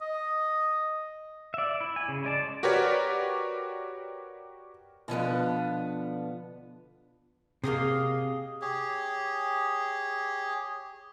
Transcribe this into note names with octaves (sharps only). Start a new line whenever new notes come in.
D#5
D5 E5
E4
G#5
C#3
G#3 D5 A5
F#4 G4 A#4 B4 C#5 D5
B2 D3 F3 B3
C3 A#3 G#4 D#5 F5
G4 G#4 C#5